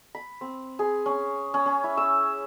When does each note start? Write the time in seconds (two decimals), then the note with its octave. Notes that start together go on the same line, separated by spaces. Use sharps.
0.15 B5
0.41 C4
0.79 G#4
1.06 C#4
1.54 C#4
1.66 C#4
1.84 E4
1.97 E6